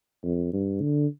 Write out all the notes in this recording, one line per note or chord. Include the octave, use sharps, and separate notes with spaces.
F2
G2
D3